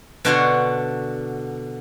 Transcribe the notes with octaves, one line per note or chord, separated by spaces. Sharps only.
B2 D3 D4 F#4 C#5 C6